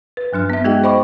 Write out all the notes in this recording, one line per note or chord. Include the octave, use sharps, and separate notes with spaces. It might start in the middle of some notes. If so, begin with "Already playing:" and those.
B4
G2 F#3 D4 F6
B3 E5
G#3 D#4 F#4 G#4 D#5 G5
C5 D#5 G5 B5 C#6 D6